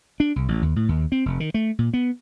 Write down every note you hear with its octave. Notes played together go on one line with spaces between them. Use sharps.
D4
C2
A1
D#2
A2
D#2
C4
F1
D#3
A3
A#2
B3